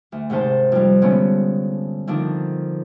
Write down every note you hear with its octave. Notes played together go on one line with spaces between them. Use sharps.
D2
G#2 C3 D#3 C5 A5
F2 G3
G2 D3 G#3 B3 C#4
D3 D#3 F3 C4 D4